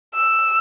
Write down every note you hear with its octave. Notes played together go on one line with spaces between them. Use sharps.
E6